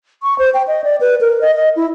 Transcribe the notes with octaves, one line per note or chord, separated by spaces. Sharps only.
C#6
C5
G5
D#5
D5
B4
A#4
D#5
D#5
E4